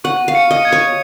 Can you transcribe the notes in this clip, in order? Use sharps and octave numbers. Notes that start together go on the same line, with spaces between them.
F#5 C#6
F5
C#7
D#5
G#6
C#5